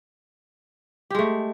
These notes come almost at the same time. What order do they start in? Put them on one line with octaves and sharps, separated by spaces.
G4 G#3 A3